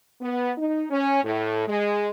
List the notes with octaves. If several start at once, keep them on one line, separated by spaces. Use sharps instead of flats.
B3
D#4
C#4
A2
G#3